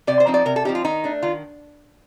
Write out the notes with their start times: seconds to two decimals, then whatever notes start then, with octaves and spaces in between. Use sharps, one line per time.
0.07 C3 D5
0.20 C5
0.27 F3 C4 D#4
0.34 D5
0.45 C3 A#4
0.56 A4
0.65 F3 C4 D#4 G4
0.75 F4
0.84 D#3 D#4
1.04 A3 D4
1.22 D#3 F4